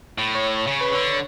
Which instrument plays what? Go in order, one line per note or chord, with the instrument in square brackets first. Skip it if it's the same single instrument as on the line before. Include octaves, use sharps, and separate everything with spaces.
[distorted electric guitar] A2
[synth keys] C#5
[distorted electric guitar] C#3 [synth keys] C#5
[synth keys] B4
[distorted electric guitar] D3 [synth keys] C#5
[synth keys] C#5